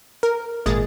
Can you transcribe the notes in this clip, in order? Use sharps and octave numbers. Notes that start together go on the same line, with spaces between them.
A#4
G#1 A#2 G#3 G#4 A6